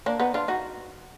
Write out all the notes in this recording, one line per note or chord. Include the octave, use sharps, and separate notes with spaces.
A#3 D4
B3 D#4
D4 F4
D#4 F#4